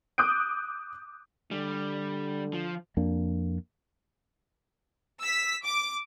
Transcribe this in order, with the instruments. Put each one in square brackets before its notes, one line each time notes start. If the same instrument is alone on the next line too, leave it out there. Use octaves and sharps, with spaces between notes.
[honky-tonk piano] D6 D#6 F#6 G6 D7
[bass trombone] D3 [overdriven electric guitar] G3
[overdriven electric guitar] F3
[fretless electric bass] F2 A#3 D4
[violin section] E6 B6
D6